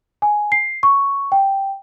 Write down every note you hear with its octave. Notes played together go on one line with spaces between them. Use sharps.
G#5
C7
C#6
G5